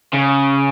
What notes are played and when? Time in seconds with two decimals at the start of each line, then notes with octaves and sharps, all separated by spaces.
0.13 C#3